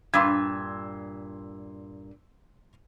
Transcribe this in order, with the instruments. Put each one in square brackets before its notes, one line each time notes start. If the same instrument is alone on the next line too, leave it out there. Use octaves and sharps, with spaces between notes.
[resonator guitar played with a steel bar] G2 A#2 [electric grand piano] C6 E6 G#6